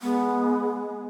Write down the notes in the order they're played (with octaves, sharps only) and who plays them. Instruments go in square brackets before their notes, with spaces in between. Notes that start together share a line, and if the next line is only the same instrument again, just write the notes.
[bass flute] G#3 [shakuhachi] B3